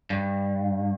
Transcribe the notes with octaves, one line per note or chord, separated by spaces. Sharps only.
G2